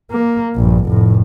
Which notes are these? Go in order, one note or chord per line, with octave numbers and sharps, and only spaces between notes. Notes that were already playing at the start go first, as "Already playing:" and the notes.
A#3
A#1 G2
F1 A2